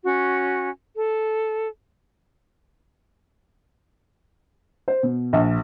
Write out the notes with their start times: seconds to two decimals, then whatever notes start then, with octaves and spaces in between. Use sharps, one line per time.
0.04 C#4 F#4
0.95 A4
4.88 C5
5.03 B2
5.33 A#1